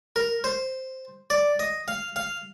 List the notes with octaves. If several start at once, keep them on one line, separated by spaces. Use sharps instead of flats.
A#4
C5
D5
D#5
F5
F5